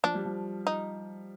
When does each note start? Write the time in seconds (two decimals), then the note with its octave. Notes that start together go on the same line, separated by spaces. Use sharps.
0.04 F3 D4
0.14 G3
0.25 F3
0.67 D#4